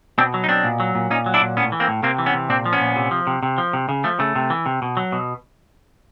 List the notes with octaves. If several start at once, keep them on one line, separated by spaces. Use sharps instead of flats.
B2 C4 D4
F#3
D#4
B2 C4 D4
A#2
F#3
A#2
A#2 C#4 D#4
F#3
D4 E4
A#2
A2 B3 C#4
E3
A#3 C4
A2
C3 A#3 C4
E3
B3 C#4
C3
A#2 C4 D4
F3
B3 C#4
A#2
C3
F3
C3
C3
F3
C3
C#3
F3 A3
C#3 A3
C3
E3
C3
B2
F#3
B2